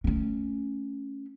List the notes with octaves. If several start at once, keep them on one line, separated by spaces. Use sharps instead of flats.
A3 C#4